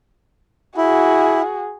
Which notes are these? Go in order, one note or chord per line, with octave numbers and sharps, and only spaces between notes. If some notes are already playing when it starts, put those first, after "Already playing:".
E4 F#4 G#4